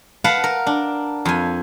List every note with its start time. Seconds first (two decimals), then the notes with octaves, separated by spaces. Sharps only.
0.24 B4 F5 F#5 A5
0.44 A#4
0.67 D4
1.25 F2 G#5